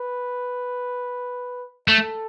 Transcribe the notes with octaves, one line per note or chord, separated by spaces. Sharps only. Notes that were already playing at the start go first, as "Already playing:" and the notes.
Already playing: B4
A3 A4